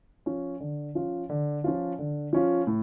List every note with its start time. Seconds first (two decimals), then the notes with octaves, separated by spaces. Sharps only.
0.26 F3 C#4 F4
0.60 D3
0.95 F3 C#4 F4
1.30 D3
1.64 F3 C#4 F4
1.99 D3
2.33 F3 C#4 F4
2.67 A2